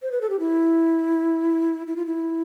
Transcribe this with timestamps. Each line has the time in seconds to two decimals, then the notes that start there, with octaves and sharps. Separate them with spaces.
0.02 C5
0.12 B4
0.21 A4
0.30 G4
0.39 E4
1.87 E4
1.96 F4
2.06 E4